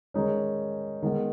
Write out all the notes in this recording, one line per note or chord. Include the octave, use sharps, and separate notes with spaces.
D#3 G#3 C#4 D#4
D#3 G#3 B3